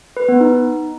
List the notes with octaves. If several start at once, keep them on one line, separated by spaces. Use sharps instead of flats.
B4
B3
D#4